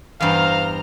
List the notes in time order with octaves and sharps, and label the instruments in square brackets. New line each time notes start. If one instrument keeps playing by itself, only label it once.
[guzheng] E2 G2 [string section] C5 A#5 F6 [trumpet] F5